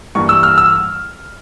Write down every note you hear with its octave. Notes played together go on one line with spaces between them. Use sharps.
G2 E3 A#3 C#6
E6
F6
E6